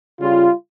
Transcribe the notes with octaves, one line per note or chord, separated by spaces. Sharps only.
C#3 G3 F4